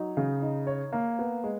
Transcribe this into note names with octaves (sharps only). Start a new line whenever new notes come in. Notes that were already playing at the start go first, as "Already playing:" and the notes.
Already playing: F#3 D#4
C#3
D#4
C#5
A#3
B3
G#3